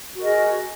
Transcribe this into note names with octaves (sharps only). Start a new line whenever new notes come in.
F#4 G#4 A#4 D#5